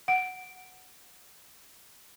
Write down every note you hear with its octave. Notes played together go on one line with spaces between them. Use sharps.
F#5 D7